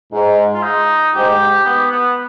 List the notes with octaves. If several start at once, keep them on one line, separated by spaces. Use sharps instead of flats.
G#2
F4
D#4
G#2 G4
B3
B3